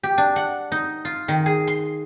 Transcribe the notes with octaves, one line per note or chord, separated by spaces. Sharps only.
G4
D4
F#5
D#4
F4
D#3
G#4
C6